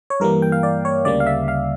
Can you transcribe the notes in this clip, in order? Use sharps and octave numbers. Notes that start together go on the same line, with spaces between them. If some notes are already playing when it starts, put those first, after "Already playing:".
C#5
G2 E3 G3 A#3 A#4
G5
F5
D5
C#5
D2 C#3 G3 A#3 D5
F5
E5
F5